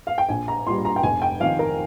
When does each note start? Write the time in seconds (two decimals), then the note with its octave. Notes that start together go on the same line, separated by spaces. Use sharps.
0.07 F5
0.18 G5
0.29 A#1 G#5
0.48 A#5
0.66 A#2 G3 C6
0.85 A#5
0.96 G5
1.03 F1 G#5
1.22 G5
1.40 F2 D#3 F5
1.59 A#4